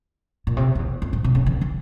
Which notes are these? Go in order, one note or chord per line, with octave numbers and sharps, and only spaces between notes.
A#2
C3
F2
E2
F2
G#2
C3
C#3
E3
F3